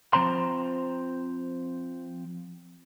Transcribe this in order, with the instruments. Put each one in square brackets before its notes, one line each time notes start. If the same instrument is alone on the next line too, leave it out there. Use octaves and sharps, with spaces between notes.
[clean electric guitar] F3 C4 C5 A#5 C6